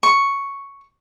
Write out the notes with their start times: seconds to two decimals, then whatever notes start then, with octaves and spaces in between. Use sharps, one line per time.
0.03 C#6